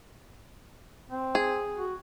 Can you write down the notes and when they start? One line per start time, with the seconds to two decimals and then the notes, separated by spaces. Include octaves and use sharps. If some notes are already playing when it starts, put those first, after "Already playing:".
1.09 C4
1.35 G#4
1.76 F#4